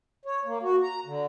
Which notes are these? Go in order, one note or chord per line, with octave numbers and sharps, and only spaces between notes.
C#5
A#3
F#4
A#5
D3